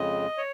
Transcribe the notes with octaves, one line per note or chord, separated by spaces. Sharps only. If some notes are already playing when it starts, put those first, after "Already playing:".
Already playing: F2 C#3 G#3 D#5
C#5